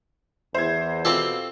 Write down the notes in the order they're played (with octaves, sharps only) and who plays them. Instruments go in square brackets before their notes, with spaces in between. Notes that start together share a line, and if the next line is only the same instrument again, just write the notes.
[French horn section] E2 [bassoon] E4 [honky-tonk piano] C5 G#6
[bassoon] B2 [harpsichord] C4 G4 A4 [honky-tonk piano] F4